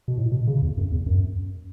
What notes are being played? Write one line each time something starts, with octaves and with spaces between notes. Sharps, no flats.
B2
A2
B2
C#3
E2
F#2
E2
F#2